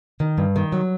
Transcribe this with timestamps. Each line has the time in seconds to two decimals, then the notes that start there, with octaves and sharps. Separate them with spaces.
0.20 D#3
0.38 G2
0.56 D#3
0.72 F#3